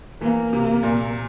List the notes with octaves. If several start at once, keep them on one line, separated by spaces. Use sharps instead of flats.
E3 A#3
C3
A#2